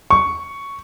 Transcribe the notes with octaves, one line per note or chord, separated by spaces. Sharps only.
C#6